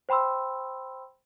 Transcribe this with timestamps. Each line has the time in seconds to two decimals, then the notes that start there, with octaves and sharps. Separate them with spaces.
0.09 C5 G5 B5 C6 E6